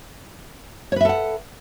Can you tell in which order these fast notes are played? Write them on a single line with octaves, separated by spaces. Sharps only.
C#5 B4 E5 A4 F#5